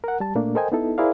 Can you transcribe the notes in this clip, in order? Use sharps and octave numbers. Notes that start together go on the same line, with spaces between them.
A#4 F#5
G3 A5
A#2 A3 A#3 D4
A4 A#4 C5 D#5 G5 G#5
B3 D#4 E4 A4
E4 G#4 A#4 C5 D5 F5